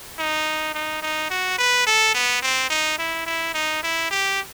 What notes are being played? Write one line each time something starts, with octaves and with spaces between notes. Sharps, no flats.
D#4
D#4
D#4
F#4
B4
A4
B3
C4
D#4
E4
E4
D#4
E4
G4